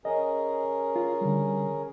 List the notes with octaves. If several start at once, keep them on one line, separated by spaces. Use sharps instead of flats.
C#4 G#4 A#4 D#5
F4
D3 G3